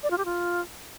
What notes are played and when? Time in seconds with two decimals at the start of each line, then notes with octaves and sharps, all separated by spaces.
0.03 D5
0.11 F4
0.18 G4
0.25 F4